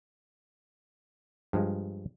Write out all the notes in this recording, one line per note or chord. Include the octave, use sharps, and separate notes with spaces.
G2 F3 G#3